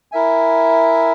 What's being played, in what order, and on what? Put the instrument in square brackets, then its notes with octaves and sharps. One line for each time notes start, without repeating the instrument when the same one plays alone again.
[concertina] E4 A#4 E5 G#5